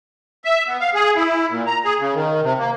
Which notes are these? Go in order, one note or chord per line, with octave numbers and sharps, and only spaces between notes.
E5
B3
F5
G#4
E4
A#2
A#5
G#4
C#3
D#3
C3
A#3